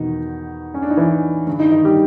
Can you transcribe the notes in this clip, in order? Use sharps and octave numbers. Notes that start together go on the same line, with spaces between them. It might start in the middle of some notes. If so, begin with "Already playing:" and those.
Already playing: E2 B2 D#3 D#4
C#4
D4
D#4
E3 E4
G2 D3
D#3 D#4
D#3 D#4
G3 G4